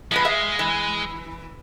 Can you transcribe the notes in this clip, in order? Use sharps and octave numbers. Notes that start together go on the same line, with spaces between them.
F3 G#3 B3 B4
G#4 E5 F5
E3